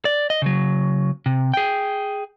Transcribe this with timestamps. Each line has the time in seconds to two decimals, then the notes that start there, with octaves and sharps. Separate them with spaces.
0.05 D5
0.30 D#5
0.42 C#3 F#3
1.26 C3
1.54 G#4 G5